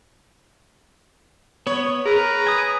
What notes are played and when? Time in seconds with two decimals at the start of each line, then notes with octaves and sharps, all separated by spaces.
1.67 B3 C#5
2.06 G#4 A#4 B4 A#5
2.47 G#5 D#6